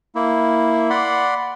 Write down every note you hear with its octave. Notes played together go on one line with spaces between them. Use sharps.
A#3 E4
D5 F#5 B5 C6